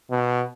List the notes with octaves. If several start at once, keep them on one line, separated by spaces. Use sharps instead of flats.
B2